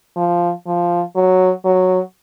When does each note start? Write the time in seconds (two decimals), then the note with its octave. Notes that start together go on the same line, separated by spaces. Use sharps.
0.17 F3
0.66 F3
1.16 F#3
1.65 F#3